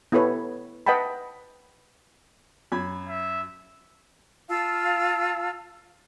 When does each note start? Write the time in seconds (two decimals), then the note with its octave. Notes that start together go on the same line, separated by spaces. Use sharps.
0.12 B3 E4 G4 A4 B4 C#5
0.86 B4 D#5 F#5 G5 A5 B5
2.72 F#2 B5 G#6
3.09 E5
4.49 F4 F5 A5 E6